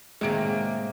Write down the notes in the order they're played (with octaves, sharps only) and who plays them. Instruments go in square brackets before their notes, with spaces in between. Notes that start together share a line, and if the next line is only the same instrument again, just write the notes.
[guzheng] A2 C3 D#3 [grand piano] G#3 D7 [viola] A#3